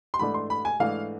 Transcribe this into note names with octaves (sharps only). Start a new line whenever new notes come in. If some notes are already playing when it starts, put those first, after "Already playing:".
C6
G#2 E3 A3 D4 B5
C6
B5
G#5
G#2 E3 A3 D4 F5